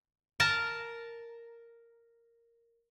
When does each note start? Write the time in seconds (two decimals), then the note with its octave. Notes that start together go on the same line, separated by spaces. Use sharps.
0.40 A#4 A5 A#5